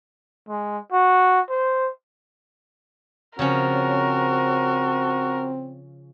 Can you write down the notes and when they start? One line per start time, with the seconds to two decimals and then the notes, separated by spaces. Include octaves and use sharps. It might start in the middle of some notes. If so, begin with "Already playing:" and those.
0.49 G#3
0.92 F#4
1.50 C5
3.39 C#3 F3 C4 C#4 F#4 A#4